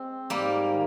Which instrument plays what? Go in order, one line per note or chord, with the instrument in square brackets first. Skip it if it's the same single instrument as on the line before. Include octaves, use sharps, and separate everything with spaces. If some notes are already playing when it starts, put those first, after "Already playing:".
Already playing: [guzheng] G#3 [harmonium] C4
[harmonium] G#2 [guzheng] G3 A#3
[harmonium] D#3